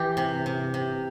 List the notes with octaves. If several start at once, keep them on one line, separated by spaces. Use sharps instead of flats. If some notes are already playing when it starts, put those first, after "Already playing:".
Already playing: E3 G4
C3
C3
C3